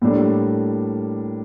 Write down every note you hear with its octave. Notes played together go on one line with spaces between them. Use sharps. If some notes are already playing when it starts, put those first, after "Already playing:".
A2 G3 A#3 D4 A4